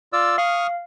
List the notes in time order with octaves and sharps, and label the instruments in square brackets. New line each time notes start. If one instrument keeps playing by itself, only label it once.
[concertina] F4 D5 E6
[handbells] F5 [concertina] C#6 D#6 F6